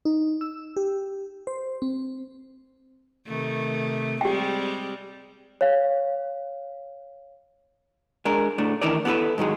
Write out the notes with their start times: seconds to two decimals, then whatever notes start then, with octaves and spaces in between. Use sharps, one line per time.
0.05 D#4
0.41 E6
0.77 G4
1.47 C5
1.82 C4
3.27 C3 D#3 A3
4.21 G3 G#3 C4 G4 G5
5.61 C#5 F5
8.25 G#3 D4 A#4
8.58 A2 A3 D4
8.81 D#3 E3 D#4 E4 A#4 D5
9.05 B3 E4 G4 A4 B4
9.38 G#2 D#3 F#3 G#3